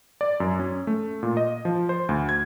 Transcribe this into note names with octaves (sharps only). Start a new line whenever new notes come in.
D5
F#2
C#4
A3
A#2
D#5
F3
C5
D2
G#6